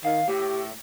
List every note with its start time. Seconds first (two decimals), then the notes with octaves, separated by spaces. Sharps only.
0.05 D#3 F5
0.28 A2 G4